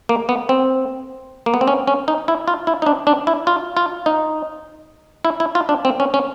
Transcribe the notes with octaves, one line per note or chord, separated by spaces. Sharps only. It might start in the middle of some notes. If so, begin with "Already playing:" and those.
A#3
B3
C4
A#3
B3
C4
C#4
C#4
D#4
E4
F4
E4
D#4
D4
D4
E4
F4
F4
D#4
E4
E4
F4
D4
C4
C#4
C#4